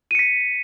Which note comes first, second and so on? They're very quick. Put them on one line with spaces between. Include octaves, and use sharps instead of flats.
D#7 C#7 B6